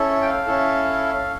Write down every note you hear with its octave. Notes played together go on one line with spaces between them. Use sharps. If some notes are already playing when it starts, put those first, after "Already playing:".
Already playing: C#4 E4 A4
G5
F5
C#4 E4 A4